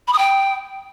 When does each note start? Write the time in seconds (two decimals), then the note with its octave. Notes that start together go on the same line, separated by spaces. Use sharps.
0.08 B5
0.13 D#6
0.18 G5